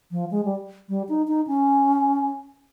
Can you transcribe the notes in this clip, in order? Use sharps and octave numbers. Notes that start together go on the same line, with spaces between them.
F3
G#3
G3
G3
D#4
D#4
C#4